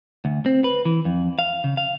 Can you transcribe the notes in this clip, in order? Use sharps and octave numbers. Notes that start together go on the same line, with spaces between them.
D2
C4
B4
E3
F2
F5
C#3
F5